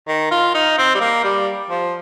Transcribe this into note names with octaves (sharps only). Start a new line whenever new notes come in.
D#3
F4
D#4
C4
G3
A#3
G3
F3